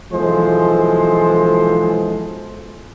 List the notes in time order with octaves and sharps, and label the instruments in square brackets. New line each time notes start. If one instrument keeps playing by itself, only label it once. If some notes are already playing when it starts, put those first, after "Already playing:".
[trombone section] B1 E3 F3 G#3 A4 C5